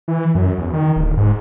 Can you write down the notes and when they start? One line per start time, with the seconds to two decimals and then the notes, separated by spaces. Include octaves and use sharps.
0.08 E3
0.35 F#2
0.58 E2
0.73 D#3
0.96 D1
1.17 G#2